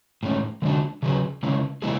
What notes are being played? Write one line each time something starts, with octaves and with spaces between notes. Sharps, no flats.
A2 G#3 C#4
D3 G#3 D4 F#4
C#3 F#3 C#4 G#4 B4
C#3 G#3 C#4 E4
C#3 G#3 B3 E4 G#4